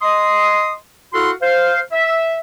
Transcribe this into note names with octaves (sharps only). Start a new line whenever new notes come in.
D#5 C6 D#6
E4 F#4 A4 F5 F#5 C6
C5 F5
E5